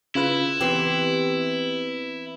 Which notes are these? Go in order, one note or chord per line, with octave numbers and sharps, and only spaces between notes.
C#3 E4 F4 B4
E3 B3 C4 G4